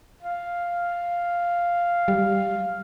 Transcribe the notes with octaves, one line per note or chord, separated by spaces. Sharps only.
F5
G3